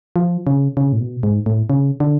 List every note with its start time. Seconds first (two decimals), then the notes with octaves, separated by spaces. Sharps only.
0.16 F3
0.47 C#3
0.77 C#3
0.93 A2
1.00 B2
1.23 G#2
1.46 A2
1.70 C#3
2.00 D3